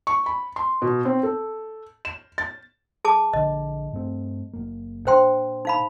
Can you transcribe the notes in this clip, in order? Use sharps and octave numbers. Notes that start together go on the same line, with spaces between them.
C#6
B5
C6
B2
C4
A4
E7
A6
G#4 A5 D6
A#1 D3 D#5
G2 A3 C4
F#1 A#3
A#2 D4 C5 G5 C6
D#4 F5 B5